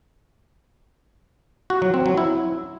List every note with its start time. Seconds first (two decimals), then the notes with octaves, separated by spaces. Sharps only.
1.70 F#4
1.82 F#3
1.94 C4
2.06 F#3
2.17 E4